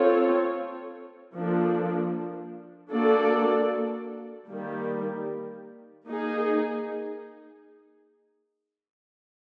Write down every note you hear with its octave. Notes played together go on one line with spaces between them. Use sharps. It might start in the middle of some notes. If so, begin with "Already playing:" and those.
Already playing: C4 F4 A4 C#5
F3 A#3 D4 F4 A4
A#3 D4 F#4 A4 D5
D#3 G3 A#3
A#3 D#4 G#4